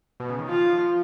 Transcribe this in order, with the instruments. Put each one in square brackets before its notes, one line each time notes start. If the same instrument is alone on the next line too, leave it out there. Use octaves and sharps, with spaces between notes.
[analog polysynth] B2
C#3
D#3
[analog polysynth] F3 [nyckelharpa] F4